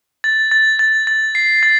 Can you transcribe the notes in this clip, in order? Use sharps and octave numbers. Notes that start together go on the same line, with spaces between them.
A6
A6
A6
A6
C7
A6